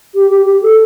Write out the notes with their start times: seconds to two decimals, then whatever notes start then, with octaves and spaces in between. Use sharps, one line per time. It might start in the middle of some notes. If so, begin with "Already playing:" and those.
0.14 G4
0.31 G4
0.46 G4
0.62 A4